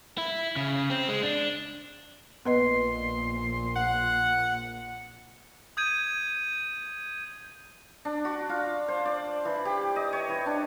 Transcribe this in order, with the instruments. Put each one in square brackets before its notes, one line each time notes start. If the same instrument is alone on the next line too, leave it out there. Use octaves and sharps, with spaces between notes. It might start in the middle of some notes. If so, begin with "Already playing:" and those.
[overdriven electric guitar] E4
C#3
C4
G#3
D4
[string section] A#1 A#2 [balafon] B3 B4 D#5 [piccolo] C6
[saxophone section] F#5
[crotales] D#6 G6 G#6 D#7
[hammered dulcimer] D4
F#4
F4
C5
D5
E3
G4
D#5
C#5
E3
D4